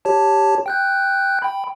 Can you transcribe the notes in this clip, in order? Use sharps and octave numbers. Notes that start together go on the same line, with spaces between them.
G4 C#5 A5
G5 F#6 G6
G5 B5